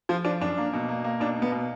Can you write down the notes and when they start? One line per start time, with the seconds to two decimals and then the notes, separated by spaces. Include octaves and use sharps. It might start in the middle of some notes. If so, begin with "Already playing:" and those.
0.09 F3 F4
0.25 F3 D4
0.40 F#2 D4
0.58 A#3
0.73 B2
0.89 A#3
1.04 A#3
1.20 B2 D4
1.36 A#3
1.42 B3
1.52 B2